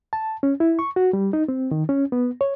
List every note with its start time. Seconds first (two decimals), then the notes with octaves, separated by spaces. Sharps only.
0.13 A5
0.43 C#4
0.60 E4
0.79 C#6
0.96 F#4
1.13 G3
1.33 D#4
1.48 C4
1.71 D#3
1.89 C#4
2.12 B3
2.41 C#5